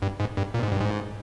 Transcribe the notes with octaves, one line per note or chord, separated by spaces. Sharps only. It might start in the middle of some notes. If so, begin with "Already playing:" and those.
G2
G#2
G2
A#2
G#2
G2
G#2